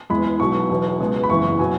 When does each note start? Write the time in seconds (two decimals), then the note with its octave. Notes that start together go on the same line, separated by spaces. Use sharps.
0.10 E1 E2 E3 G#3 B5
0.40 B1 B2 F#3 C#6
0.70 E1 E2 B2 F#3
1.00 C#2 B2 G#3
1.24 B5
1.30 F#1 E2 E3 C#6
1.59 B2 F#3 G#5